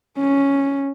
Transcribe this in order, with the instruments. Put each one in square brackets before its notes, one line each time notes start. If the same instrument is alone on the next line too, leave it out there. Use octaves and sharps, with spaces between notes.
[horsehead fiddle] C#4